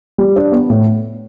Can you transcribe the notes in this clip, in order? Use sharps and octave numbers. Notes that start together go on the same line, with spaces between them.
G3
D4
B3
A2